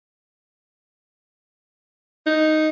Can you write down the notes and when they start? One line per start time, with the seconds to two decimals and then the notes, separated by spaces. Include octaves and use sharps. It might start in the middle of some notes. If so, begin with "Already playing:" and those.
2.27 D#4